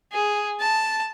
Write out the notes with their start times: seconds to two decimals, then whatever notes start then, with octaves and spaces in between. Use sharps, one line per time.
0.13 G#4
0.61 A5